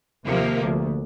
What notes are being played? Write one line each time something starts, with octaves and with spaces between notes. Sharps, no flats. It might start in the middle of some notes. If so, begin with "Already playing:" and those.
D#2 C3 F3 A#3
D2